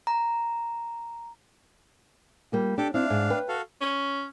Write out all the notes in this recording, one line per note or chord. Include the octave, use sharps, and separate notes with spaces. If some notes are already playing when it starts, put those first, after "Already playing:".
A#5
G3 A#3 F4
D4 G4 A4 D6
C4 D4 E4 F5
G#2
B4 G5
F#4 A4 F5
C#4